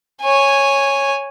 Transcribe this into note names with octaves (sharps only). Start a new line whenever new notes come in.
C#5 G#5